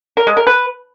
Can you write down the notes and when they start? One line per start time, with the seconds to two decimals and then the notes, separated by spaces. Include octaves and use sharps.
0.17 A#4
0.27 G#3
0.37 A#4
0.47 B4